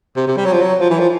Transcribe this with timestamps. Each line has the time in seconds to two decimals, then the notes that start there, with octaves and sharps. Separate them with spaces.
0.16 C3
0.27 C3
0.37 G3
0.45 F#3
0.53 F3
0.61 F#3
0.80 F3
0.90 E3
1.00 F3